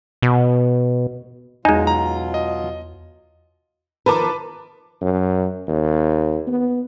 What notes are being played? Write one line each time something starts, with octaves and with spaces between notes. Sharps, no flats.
B2
E2 B2 F#3 G#3 D#4 F4
A#5
D#5
D#3 F3 A#4 B4 A5 D6
F#2
D#2
B3